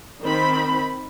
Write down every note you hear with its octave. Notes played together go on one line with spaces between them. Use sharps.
D#3 C4 B5